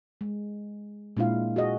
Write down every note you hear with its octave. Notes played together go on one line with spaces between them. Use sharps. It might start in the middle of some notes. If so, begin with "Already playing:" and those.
G#3
A#2 G#3 D4 E4 F4 F5
F#4 G#4 D#5